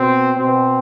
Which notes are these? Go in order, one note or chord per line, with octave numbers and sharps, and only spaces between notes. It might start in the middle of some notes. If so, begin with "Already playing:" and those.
Already playing: B2 C4
B2 C4